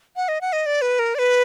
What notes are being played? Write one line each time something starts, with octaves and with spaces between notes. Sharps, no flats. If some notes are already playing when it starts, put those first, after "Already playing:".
F#5
D#5
F#5
D#5
D5
B4
A#4
D5
B4